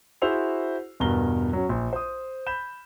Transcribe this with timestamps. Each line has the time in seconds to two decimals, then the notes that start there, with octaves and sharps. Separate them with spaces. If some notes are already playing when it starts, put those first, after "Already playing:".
0.22 E4 F#4 G#4 C5 E6 F7
1.00 E2 G2 B2 A#4 A#5 G7
1.53 F#3 C#4
1.69 A#1
1.93 C5 D#6
2.47 B5 G6 E7